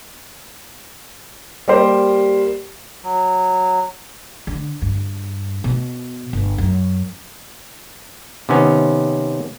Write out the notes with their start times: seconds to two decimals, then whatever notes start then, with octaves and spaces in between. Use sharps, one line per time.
1.68 G3 A#3 G4 A#4 C5
3.04 F#3
4.47 D3
4.82 G2
5.64 B2
6.33 G1
6.58 F#2
8.49 C3 D#3 B3 C#4